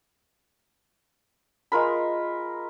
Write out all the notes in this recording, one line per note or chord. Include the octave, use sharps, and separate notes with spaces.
G#3 F4 A#4 B5